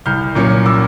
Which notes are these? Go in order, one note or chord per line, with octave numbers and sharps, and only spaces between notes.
C2 F6 G6
A#2 F#3 A#3 C#4
D6 E6